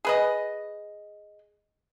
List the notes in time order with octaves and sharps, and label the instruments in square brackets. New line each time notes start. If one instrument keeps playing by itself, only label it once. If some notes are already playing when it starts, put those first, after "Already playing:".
[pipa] G#4 B4 D#5